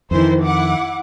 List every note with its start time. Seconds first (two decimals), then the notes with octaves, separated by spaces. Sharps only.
0.11 F2 D#3 E3 E4 C5
0.43 E4 F#5 D6